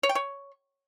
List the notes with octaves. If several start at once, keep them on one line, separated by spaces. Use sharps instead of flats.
C#5
G5
C#5